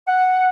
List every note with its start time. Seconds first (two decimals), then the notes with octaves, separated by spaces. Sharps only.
0.07 F#5